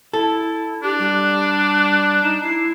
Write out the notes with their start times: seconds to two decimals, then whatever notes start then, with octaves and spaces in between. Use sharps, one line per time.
0.13 E4 A4
0.83 D4 G4 F#6
0.99 G3
2.23 D#4 E7
2.43 E4 C7